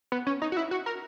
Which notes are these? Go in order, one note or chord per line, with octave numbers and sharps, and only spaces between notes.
B3
C#4
D#4
F#4
E4
F#4
A#4